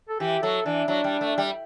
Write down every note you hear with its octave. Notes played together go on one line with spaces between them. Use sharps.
A4
E3 G4
F#3 A4
E3 D4
F#3 D4
G3
A3
G3